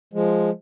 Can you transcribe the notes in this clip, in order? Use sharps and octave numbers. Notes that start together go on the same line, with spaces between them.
F3 G#3